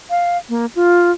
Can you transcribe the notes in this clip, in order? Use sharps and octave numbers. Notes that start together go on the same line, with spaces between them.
F5
A#3
F4